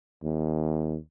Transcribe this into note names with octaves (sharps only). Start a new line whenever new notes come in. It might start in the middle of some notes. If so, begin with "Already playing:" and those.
D#2